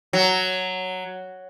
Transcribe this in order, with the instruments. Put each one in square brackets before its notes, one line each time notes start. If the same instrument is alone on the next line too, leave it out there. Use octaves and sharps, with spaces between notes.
[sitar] F#3